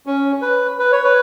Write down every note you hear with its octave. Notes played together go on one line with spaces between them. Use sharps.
C#4
B4
B4
C#5
B4